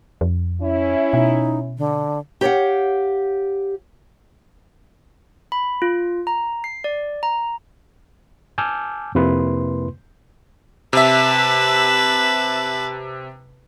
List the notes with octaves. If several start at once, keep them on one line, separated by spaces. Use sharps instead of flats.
F2
C#4 E4
B2 D#4
D3
G4 C#5 D5 F5 F#5
B5
F4
A#5
C7
D5
A#5
G#5 A5 D6 E6 F6 G6
F2 C3 A#3 E4 B4 C6
C3 B4 E5 A5